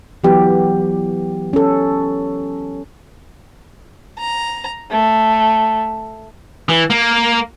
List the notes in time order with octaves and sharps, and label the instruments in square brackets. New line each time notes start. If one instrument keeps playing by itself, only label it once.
[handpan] E3 F#3 B3 G4
C#4 A4
[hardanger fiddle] A#5
A3
[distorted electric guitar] E3
A#3